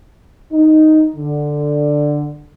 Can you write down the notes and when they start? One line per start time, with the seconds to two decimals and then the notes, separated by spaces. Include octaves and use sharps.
0.53 D#4
1.16 D3